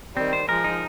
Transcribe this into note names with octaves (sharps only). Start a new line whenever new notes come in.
D#3 G3 C4
C5
F3 G#3 A#4
D#4